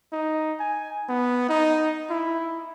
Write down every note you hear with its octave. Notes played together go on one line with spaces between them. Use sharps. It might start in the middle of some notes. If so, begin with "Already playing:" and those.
D#4
G#5
B3
D#4
E4